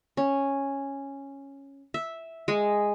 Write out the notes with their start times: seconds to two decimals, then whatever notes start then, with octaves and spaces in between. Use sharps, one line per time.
0.17 C#4
1.94 E5
2.48 G#3